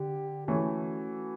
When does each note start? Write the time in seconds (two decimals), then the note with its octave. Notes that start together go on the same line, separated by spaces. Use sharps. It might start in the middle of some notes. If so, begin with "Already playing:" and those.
Already playing: D3 G4
0.48 E3 A3 C#4 F#4